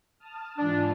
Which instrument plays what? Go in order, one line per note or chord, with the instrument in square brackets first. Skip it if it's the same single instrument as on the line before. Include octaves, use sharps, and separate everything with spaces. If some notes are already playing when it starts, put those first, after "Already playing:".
[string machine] A5 D#6 F6
[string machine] G#2 E3 F4 [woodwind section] D4